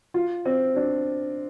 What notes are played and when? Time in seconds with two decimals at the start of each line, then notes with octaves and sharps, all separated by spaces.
0.14 F4
0.45 C4
0.76 D4